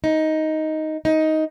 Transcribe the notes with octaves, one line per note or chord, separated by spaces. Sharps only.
D#4
D#4